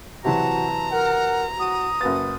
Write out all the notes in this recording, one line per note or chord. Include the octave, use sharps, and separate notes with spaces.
C3 E3 F#3 F#4 A5 A#5
A#4 F#5
F#4 D#6
F#1 F#4 B4 A6